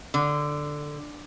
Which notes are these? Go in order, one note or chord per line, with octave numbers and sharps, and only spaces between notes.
D3